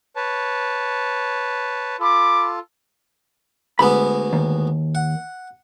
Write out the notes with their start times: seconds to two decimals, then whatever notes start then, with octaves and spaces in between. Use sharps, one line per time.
0.16 B4 C#5 A5
2.00 F4 A4 B5 D6
3.79 D2 G#3 B3 B5
4.33 D#2
4.95 F#5